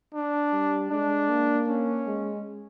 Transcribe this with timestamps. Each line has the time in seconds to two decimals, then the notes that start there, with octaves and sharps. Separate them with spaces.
0.14 D4
0.53 G3
0.91 G#3 D4
1.30 A#3
1.68 C#4
2.07 G#3